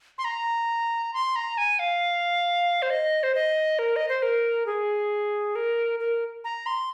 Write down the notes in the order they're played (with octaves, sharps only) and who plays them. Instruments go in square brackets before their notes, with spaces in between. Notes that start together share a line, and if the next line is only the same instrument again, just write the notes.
[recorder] C6
A#5
C6
A#5
G#5
F5
C5
D#5
C5
D#5
A#4
D#5
C5
A#4
G#4
A#4
A#4
A#5
C6